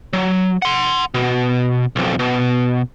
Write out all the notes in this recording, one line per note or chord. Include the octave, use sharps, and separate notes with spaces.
F#3
F#5 C6
B2
B1 F2
B2